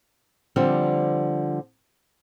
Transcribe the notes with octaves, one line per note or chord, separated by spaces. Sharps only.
D3 F3 G3 C4